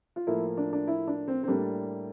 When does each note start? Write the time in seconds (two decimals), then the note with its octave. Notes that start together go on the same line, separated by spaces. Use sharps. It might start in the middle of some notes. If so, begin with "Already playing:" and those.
0.16 F4
0.27 A2 F3 A#3 E4
0.57 D4
0.73 D4
0.87 E4
1.07 D4
1.28 C4
1.43 C4
1.48 A2 G3 A#3 D4